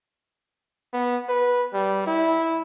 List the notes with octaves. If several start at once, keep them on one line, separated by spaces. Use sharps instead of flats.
B3
B4
G3
E4